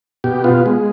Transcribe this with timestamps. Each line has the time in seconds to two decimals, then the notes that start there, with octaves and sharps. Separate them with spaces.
0.24 B2 G4
0.44 B3 F4
0.66 G#3